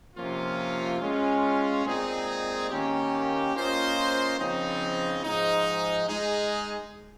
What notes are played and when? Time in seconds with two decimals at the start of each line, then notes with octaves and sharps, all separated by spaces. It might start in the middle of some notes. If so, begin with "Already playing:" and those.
0.16 C3 F3 A#3 C#4 F4
1.00 G#3 C#4 F4
1.85 A#2 G#3 C4 D#4 G#4
2.70 D#3 A#3 C#4 G4
3.54 A#3 C#4 F4 C5 D#5
4.39 C#3 F3 C4 D#4
5.23 G#2 F3 G#3 D#4
6.09 G#3 D#4 G#4